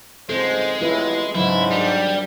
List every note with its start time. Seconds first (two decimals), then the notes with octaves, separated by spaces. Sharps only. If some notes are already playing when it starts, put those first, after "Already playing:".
0.29 C#2 G#2 G#3 C4 A4 C5
0.81 A1 E4 F4 G#4 B4
1.35 G#2 C#3 F#3 E4
1.71 G#1 G3 D4